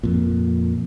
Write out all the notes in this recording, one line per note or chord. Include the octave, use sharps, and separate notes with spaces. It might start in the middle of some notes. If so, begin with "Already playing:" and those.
F2 A#2